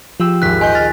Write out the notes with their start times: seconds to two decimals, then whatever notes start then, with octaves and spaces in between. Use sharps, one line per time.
0.20 F3 F4 G4 E6
0.42 G#1 D#2 F#6 B6
0.61 A#1 D#5 G#5 C6 G6
0.75 F6 A6